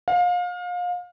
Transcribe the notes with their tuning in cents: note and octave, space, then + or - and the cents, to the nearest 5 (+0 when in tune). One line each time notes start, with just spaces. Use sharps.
F5 +30